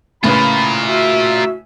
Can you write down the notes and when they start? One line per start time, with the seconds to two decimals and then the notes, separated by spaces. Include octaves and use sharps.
0.24 A2 C#3 F4 A#4 B4 B5
0.86 F#4 E5